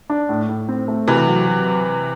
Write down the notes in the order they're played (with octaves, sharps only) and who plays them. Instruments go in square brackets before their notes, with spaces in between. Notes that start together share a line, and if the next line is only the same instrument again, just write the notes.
[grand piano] D4
A2
A2
C4
A3
[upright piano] C3 E3 [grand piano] F#4
[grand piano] F#3
F#3